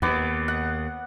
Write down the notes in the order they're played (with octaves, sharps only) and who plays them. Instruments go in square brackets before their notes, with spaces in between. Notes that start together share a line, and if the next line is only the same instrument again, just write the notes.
[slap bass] D#2 [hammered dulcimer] B3 D6
[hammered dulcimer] F#5